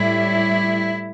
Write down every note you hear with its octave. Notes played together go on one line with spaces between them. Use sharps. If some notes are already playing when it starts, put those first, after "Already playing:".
Already playing: A2 G3 E4